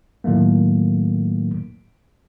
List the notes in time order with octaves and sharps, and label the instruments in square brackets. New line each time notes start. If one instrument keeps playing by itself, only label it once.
[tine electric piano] A2 D#3 F#3 A3 A#3